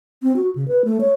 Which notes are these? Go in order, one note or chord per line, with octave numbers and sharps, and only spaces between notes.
C4
F#4
C#3
B4
A3
C#5